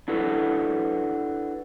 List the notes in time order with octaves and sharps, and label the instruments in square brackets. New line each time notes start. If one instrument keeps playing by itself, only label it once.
[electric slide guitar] D4 E4 F#4 A4 B4